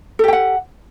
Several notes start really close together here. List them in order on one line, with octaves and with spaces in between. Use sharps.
A4 G4 G5 F#5